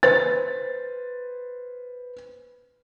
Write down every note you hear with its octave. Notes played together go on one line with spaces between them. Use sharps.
B4 C5 A6